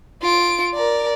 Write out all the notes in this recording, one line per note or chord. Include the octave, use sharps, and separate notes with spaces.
F4 D7
A#4 D5